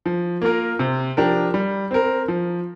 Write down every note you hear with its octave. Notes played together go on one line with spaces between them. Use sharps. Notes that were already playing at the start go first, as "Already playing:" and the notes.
F3
A#3 F4 A#4
C3
F3 D4 G4 A#4
G3
C4 A#4
F3